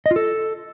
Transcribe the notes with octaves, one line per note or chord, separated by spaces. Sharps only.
D#5
F4
A4